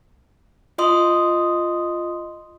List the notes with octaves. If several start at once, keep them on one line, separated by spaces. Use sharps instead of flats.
F4 D#5 C6 D#6